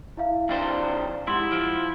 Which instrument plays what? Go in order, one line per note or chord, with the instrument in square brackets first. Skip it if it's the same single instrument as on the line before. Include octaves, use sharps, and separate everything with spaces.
[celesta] E4 E5 F5
[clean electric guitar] F2 D4 C5
[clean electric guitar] G#2 [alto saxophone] E4 [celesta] G4 F#5 C6
[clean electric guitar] F3 [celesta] D7